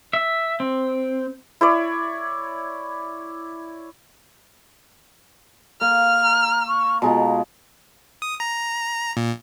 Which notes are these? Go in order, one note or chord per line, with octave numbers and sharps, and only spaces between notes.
E5
C4
E4 C#5 D5
A#3 F6
A#5
C#6
B2 G#3 F4 A#5
D#6
A#5
A#2